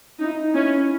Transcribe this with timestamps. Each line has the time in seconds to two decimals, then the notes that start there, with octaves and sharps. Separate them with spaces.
0.19 C#4 D#4
0.25 E4
0.32 D#4
0.43 D#4
0.54 C#4 E4